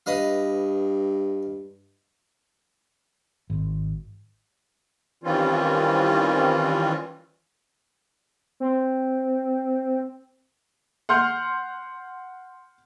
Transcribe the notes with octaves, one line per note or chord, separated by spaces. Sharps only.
G2 B4 D#5 F5
G#1
D#3 E3 G3 C4 C#4 F4
C4
F#5 C6 F6 G6